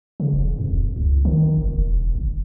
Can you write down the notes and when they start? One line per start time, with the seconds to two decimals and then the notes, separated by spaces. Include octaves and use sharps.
0.20 C#3
0.33 E1
0.58 F2
0.72 D#1
0.96 C#2
1.25 D#3
1.57 F#1
1.73 E1
2.15 G1